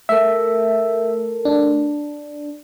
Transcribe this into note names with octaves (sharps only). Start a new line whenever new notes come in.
A3 A4 A#4 E5
D4